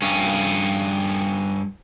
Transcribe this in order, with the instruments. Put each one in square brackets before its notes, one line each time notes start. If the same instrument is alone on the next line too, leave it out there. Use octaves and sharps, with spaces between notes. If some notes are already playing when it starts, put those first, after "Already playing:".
[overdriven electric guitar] G2 C#4